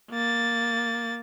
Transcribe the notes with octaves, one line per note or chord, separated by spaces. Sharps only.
A#3 A6